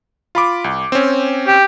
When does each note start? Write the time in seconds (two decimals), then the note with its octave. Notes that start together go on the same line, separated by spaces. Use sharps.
0.35 F4 B5 D6
0.64 C2
0.92 C4 C#4
1.47 G4